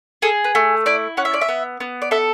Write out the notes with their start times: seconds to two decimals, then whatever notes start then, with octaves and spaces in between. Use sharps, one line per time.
0.22 G#4 A4
0.44 B4
0.55 A3
0.86 E4 D5
1.17 C#4 F#5
1.25 E5
1.34 D5
1.41 E5
1.49 B3
1.80 B3
2.02 D5
2.11 A4 E5